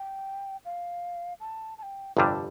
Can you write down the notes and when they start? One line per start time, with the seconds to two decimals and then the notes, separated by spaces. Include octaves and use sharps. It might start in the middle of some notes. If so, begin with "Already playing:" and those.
Already playing: G5
0.65 F5
1.40 A5
1.78 A5
1.83 G5
2.17 G1 F2 C3 G3 D4 A5